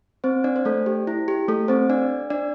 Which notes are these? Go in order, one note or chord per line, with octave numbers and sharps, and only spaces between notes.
C4 C5
D4 D5
C5
A3 A4
G4
E4
G4
A3 A4
C4 C5
D4 D5
D4 D5